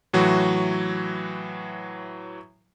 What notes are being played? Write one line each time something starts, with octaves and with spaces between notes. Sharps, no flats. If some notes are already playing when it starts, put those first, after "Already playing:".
A2 E3 F#3 F#4